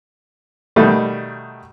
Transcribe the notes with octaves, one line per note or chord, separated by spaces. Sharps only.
B2 D#3 G3 A3